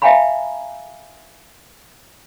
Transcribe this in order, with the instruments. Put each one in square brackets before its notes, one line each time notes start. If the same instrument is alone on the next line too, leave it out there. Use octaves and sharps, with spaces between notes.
[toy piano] E5 F5 G5 G#5 A#5 B5